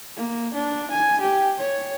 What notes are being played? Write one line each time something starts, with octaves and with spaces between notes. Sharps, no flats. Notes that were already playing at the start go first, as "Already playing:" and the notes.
A#3
D4
G#5
G4
C#5